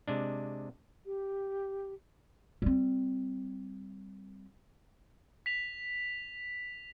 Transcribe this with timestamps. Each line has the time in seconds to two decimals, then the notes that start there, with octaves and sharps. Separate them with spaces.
0.08 C3 G#3 D4
1.06 G4
2.62 G3 C4
5.46 B6 F7